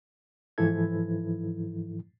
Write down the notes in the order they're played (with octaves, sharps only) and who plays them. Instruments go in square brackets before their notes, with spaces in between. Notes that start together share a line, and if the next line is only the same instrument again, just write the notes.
[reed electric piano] G#2 E3 F3 E4 A4 G#6